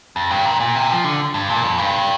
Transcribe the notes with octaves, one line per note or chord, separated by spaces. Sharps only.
F2
G2
A#2
A#2
C3
F3
D3
G2
A#2
F2
G2